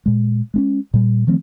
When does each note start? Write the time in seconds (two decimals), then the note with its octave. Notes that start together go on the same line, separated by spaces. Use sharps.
0.06 A#2 G#3
0.54 G#3 C4 C#4
0.94 A#2 G3
1.27 D#3 F3 A3 C4